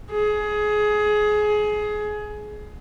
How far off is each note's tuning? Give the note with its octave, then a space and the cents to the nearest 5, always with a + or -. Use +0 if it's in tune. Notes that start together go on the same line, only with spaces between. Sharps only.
G#4 +20